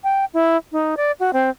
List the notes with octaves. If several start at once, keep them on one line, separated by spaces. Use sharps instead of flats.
G5
E4
D#4
D5
F#4
C4